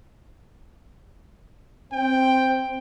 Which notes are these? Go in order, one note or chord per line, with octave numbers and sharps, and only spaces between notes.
C4 G5